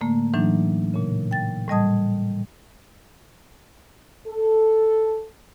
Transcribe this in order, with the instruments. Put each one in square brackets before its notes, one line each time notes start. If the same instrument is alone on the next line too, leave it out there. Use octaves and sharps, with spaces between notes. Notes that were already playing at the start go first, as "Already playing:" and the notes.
[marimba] A2 D3 A3 A#3
A2 E3 F#3 D4 D#4
A#2 C#3
G5 A6
A2 G3 D#5 A5 D#6 G#6
[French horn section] A4